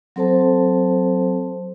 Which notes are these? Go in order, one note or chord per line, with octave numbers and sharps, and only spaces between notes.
F#3 C4 A4 C5 A5